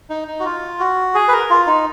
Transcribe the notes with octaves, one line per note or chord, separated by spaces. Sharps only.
D#4
D#4
F#4
F4
F#4
G#4
B4
A#4
F4
D#4